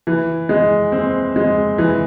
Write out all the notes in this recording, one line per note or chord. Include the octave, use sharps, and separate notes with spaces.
E3
G#3
C4
G#3
E3